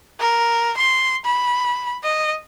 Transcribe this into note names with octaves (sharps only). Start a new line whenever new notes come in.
A#4
C6
B5
D#5